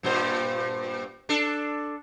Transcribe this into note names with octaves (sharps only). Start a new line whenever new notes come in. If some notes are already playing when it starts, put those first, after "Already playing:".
G2 A#2 C5
D4 A4